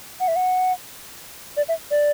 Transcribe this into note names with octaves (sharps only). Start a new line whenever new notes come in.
F#5
E5
F#5
D5
E5
D5